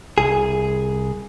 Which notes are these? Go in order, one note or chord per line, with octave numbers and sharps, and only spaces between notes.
C2 G#4